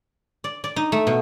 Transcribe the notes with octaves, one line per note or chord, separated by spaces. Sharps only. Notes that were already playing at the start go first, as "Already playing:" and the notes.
D5
D5
D#4
A3
B2